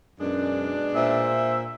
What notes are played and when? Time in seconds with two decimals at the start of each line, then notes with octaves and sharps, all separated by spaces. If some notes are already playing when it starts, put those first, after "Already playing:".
0.20 F#2 B2 G#3 D4
0.95 A#2 C5 E5